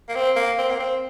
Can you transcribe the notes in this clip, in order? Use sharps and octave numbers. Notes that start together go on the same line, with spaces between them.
A#3
C4
A#3
C4
A#3
C4